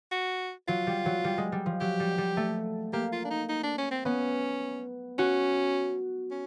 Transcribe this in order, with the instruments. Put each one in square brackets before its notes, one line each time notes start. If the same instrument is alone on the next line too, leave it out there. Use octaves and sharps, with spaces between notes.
[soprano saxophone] F#4
[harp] F#3 [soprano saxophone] F4
[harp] G3
F#3
G3
G#3
G3
F3
[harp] F#3 [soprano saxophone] G4
[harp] G3
G3
A3
[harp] A#3 [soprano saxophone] G4
[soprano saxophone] F4
D4
D#4
D#4
D4
C#4
C4
[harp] B3 [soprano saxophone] C#4
[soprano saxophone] C#4 [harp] F#4
[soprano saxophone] C#4